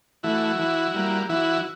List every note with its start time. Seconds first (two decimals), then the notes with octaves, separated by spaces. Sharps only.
0.23 E3 A3 E4 F#4
0.59 E3
0.94 G3 A#3
1.29 E3 E4 F#4